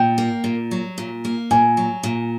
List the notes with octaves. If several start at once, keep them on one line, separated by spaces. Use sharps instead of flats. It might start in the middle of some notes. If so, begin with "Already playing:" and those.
Already playing: A#2 G5
A#3
A#2
F#3
A#2
A#3
A#2 G#5
F#3
A#2